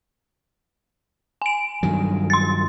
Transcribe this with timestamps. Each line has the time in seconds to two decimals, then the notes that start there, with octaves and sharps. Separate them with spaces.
1.42 G#5 D7
1.83 G2 D#3 F#3
2.30 C6 A6